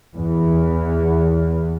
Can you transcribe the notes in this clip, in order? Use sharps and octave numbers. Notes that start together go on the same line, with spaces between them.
E2